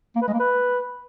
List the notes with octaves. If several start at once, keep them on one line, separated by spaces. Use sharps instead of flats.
A#3
B4
G#3
A#3
B4